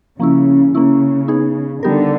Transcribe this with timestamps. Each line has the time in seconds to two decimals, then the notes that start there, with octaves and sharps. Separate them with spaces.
0.19 C#3 F3 A#3 C#4 E4
0.74 C#3 A#3 C#4 E4
1.28 B3 D#4 G#4
1.83 D3 G3 B3 D#4 G4 A#4